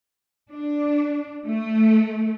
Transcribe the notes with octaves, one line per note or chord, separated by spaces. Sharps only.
D4
A3